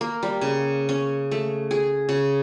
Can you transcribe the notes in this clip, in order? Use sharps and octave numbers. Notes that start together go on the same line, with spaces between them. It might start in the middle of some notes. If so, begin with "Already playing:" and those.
A#3
G3
C#3
C#4
A3
G#4
C#3